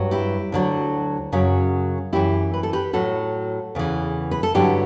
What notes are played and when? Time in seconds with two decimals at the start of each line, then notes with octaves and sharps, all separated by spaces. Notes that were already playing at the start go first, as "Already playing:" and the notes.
Already playing: G2 F#3
0.11 E4 G4
0.52 D2 D3 F#3
1.32 F#2 C#3 F#3
2.13 F#2 E3 E4 G4
2.54 B4
2.63 A4
2.73 G4 B4
2.93 A2 F#3 F#4 A4
3.75 E2 C#3 E3
4.31 B4
4.43 A4
4.54 G2 D3 F#3 E4 G4